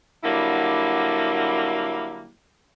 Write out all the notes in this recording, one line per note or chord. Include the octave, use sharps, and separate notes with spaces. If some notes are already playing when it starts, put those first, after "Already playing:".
D3 F#3 G3 A#3 E4